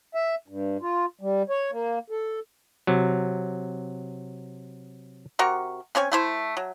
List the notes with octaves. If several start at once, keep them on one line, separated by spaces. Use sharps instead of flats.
E5
G2
F4
G3
C#5
A#3
A4
C3 F#3
C3 F#4 A#4 C#6
C4 C#4 C#5 G#5
A3 E4 C5
F#3